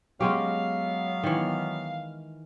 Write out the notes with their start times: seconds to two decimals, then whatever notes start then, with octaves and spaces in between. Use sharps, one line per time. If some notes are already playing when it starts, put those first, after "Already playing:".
0.20 F#3 G#3 B3 C#4 G4 F5
1.24 D#3 E3